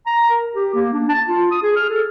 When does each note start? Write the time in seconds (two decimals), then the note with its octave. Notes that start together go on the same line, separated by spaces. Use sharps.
0.06 A#5
0.30 A#4
0.56 G4
0.74 A#3
0.93 D4
1.09 A5
1.29 F4
1.51 D#6
1.63 G#4
1.76 F6
1.90 A4